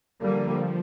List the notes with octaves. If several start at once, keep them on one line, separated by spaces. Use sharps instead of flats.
D3 F3 G3 A#3